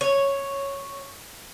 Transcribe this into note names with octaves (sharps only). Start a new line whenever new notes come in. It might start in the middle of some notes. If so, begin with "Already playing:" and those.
C#5